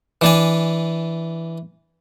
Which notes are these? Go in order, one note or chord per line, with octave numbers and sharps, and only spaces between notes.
E3 D4 G#5